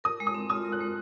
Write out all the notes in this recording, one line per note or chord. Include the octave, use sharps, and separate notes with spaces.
A#4 D#6
G#3
D#6
C4
F4 D#6
A#4
F#6
G#3